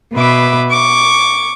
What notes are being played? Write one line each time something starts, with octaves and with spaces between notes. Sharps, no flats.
B2 B4 E5 D6
C#6 D6